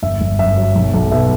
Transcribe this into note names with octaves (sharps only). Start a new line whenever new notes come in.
G1 E5
G1
F#2 E5
F#3
B1
B1
B2 E5